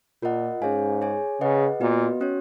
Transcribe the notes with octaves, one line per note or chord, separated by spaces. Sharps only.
A#2 F4 A#4 D#5 F#5
G#2 C#4 G#4 C#5 F5 G#5
G#4 C#5 G#5
C#3 G#4 B4 D#5 F#5
A#2 B3 F#4 B4 D#5
C#4 F#4 C#5